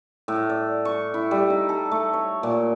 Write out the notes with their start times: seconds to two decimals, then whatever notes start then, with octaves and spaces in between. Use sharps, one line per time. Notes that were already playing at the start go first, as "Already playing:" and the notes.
0.28 A2
0.49 D5
0.85 C#6
1.14 E4
1.31 G3
1.50 D#4
1.69 A4
1.91 A3
2.13 C#5
2.43 A#2